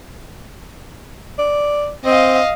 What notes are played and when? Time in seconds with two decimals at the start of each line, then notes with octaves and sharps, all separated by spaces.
1.38 D5
2.05 C4 D#5 F5